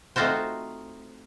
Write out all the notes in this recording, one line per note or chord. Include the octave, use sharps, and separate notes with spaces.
A3 C4 D#4 F4 F#4 C5